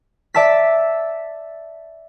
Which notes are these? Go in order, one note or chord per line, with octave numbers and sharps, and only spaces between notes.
D5 E5 A5 E6 B6